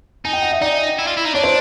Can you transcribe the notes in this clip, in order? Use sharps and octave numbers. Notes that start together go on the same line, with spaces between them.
D#4 G#5
G5
F#5
E5
D#4 D5
E4
F4
E4
D#4
D4 C#5
C5